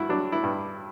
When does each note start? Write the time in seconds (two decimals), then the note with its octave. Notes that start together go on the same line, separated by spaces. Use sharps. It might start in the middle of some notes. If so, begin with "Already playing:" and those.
Already playing: G2 E4 F#4
0.09 F#3 D4
0.32 E4
0.43 G2